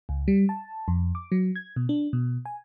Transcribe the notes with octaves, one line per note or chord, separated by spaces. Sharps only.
C#2
G3
A5
F2
D6
F#3
G#6
B2
D4
B2
G#5